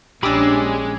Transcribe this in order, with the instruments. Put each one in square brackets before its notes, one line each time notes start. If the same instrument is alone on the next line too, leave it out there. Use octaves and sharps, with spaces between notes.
[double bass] A#1 C#4 [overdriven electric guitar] G#3 [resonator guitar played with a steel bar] D4 G4 [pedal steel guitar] B5 D6 E6